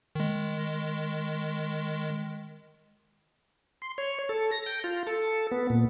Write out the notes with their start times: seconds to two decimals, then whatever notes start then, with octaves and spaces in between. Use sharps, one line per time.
0.15 D#3 G#3
3.82 C6
3.98 C#5
4.29 A4
4.51 A#6
4.66 G5
4.84 F4
5.07 A4
5.52 B3
5.70 A#2